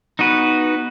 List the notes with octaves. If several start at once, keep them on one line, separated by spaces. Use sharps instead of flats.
B3 D#4 F#4 B4